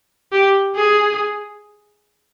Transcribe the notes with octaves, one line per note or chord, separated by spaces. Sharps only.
G4
G#4